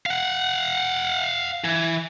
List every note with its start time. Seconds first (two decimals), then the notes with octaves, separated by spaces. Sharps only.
0.06 F5 F#5
1.64 E3